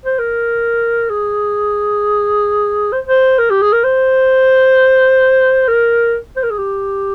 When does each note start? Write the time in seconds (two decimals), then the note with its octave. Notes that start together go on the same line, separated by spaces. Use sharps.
0.05 C5
0.19 A#4
1.10 G#4
2.93 C5
3.07 C5
3.38 A#4
3.50 G4
3.62 G#4
3.73 A#4
3.84 C5
5.68 A#4
6.36 C5
6.43 A#4
6.51 G#4
6.58 G4